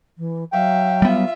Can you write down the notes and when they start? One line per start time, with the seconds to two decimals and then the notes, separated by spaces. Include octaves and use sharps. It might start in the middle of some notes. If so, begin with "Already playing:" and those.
0.18 E3
0.53 F#3 E5 F5 G5
1.02 G3 B3 F4 E5